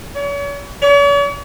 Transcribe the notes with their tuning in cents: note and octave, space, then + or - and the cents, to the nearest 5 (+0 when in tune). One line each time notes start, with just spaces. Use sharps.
C#5 +40
C#5 +45